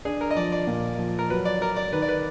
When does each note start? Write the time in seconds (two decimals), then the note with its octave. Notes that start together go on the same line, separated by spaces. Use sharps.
0.05 D4 G#4
0.21 A#4
0.31 D#5
0.36 F3 D5
0.52 D5
0.67 A#2
0.98 F3
1.19 A#4
1.30 F#3 B4
1.45 D5
1.61 F#3 A#4
1.76 D5
1.92 D#3 B4
2.02 D5
2.09 B4